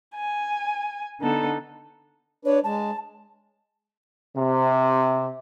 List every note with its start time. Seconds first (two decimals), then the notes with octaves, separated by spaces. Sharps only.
0.14 G#5
1.20 D3 B3 D#4 A4
2.45 D4 B4 C#5
2.64 G#3 A5
4.35 C3